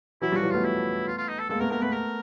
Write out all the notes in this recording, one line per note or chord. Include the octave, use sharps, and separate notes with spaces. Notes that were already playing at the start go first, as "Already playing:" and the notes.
E3 F#3 E4
F3 G3 F#4
E3 F#3
A3 B3 F4
E4
F4
F4
D#4
A4
G#3 A#3 A4
A3 B3 A#4
A3 B3 A#4
A3 B3 B4
A#4